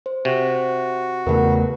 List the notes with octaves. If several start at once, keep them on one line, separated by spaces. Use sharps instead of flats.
C5
C3 F#4
E2 C#3 A3 A#4 B4 F#5